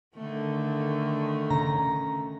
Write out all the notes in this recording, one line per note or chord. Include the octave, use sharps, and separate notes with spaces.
D3 D#3 A3
C#3 A#5